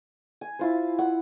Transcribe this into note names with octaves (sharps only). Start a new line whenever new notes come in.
G#5
E4 F4 C5
F#5